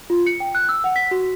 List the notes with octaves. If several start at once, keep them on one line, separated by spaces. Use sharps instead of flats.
F4
C#7
G5
F#6
E6
F#5
B6
F#4